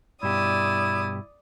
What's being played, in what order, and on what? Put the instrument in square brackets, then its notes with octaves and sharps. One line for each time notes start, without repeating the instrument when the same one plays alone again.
[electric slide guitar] G2 B2 G4 [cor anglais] E4 [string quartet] D5 D#6